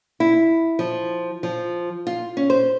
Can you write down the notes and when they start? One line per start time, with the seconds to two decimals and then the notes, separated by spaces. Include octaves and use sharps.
0.20 E4
0.79 F3
1.43 F3
2.07 F4
2.37 C#4
2.50 C5